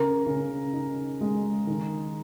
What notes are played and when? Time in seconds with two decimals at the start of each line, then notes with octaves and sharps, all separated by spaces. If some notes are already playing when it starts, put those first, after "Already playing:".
Already playing: C#3 A#4
0.26 C#3
0.73 D#4
1.21 G#3
1.67 D#3